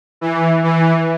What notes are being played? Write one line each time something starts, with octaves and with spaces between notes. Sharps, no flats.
E3
E3